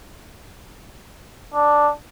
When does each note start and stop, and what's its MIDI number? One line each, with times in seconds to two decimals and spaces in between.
1.54 1.91 62